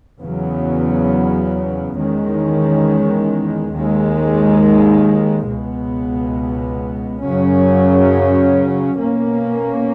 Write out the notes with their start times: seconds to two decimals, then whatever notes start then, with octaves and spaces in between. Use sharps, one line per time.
0.20 E2 C#3 F#3 B3
1.96 E2 D#3 G#3 C#4
3.71 D#2 D#3 G#3
5.47 C#2 B2 G#3 B3
7.22 F#2 C#3 F#3 C#4
8.98 B2 A#3 C#4